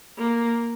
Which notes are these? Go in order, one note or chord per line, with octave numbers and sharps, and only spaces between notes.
A#3